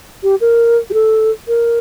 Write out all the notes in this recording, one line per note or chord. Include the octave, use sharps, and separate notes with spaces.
G4
A#4
G4
A4
A#4